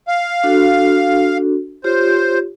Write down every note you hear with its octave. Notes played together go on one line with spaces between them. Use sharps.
F5
D4 F#4 A4
F4 G4 C5 C#5